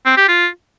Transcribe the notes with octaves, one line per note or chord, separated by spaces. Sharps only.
C4
G4
F4